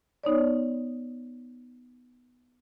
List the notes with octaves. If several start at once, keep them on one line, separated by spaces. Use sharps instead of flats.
B3 D#4 C#5 D5